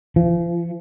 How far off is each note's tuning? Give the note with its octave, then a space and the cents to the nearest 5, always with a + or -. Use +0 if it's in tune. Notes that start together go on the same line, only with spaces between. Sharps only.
F3 -35